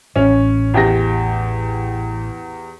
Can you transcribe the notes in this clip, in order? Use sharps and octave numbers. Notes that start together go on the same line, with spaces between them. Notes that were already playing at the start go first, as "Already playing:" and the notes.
A1 C#4
E2 G4 A#6